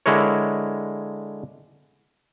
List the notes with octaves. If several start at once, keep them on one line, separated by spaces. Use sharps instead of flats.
D3 G#3 E4 A#4 C#5